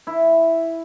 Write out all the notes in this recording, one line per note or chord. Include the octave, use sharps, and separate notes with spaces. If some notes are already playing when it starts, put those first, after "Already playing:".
E4